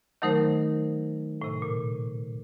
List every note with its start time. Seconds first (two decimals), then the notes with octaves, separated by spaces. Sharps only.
0.22 D#3 F#3 A3 D#4 A#4 C5
1.42 A2 C3
1.62 A#2